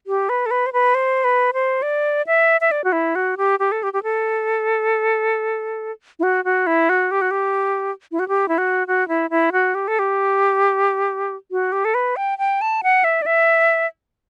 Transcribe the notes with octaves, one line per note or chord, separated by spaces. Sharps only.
G4
B4
A4
B4
C5
B4
C5
B4
C5
D5
E5
E5
D5
F#4
E4
F#4
G4
G4
A4
G4
G4
A4
E4
F#4
F#4
E4
F#4
G4
F#4
G4
E4
F#4
G4
E4
F#4
F#4
E4
E4
F#4
G4
A4
G4
F#4
G4
A4
B4
G5
G5
A5
F#5
E5
D5
E5